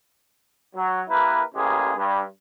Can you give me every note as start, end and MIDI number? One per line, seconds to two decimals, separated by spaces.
0.76 1.01 54
1.08 1.42 58
1.08 1.42 64
1.08 1.42 67
1.08 1.42 70
1.08 1.42 71
1.55 1.92 33
1.55 1.92 49
1.55 1.92 56
1.55 1.92 58
1.55 1.92 67
1.55 1.92 68
1.96 2.22 43